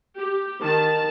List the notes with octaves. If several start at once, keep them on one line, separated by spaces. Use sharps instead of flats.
G4
D#3 A5